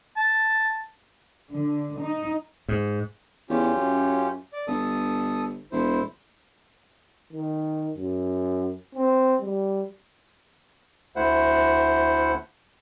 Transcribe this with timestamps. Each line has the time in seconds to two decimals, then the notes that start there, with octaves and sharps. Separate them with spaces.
0.17 A5
1.51 D3
1.99 D#4
2.68 G#2
3.50 E2 C#4 F4 G4
3.77 F#2
4.53 D5
4.67 G1 A4 D#6
5.72 E1 E4 C5
7.33 D#3
7.97 F#2
8.95 C4
9.41 G3
11.16 D2 A3 E4 C5 F#5